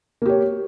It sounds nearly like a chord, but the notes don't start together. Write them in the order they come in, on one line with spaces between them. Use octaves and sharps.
A#3 G4 C#5